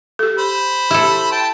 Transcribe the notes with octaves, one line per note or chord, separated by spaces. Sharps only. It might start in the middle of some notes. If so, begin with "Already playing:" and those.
G4 A4
C5 B5
E4 G4 A4 E5
G5 A5